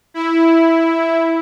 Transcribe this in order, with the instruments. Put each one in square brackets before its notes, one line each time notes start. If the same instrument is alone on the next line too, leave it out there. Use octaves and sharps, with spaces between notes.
[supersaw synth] E4